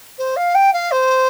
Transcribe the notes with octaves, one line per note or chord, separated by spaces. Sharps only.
C5
F5
G5
F5
C5